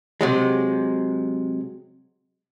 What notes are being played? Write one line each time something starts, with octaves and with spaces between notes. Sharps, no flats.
C3 F#3 G#3